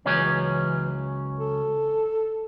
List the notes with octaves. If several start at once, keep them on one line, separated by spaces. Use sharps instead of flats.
C#2 E3 F#3 C#4
A4